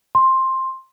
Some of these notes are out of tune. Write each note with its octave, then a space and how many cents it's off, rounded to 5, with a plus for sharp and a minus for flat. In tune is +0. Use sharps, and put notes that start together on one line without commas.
C6 +10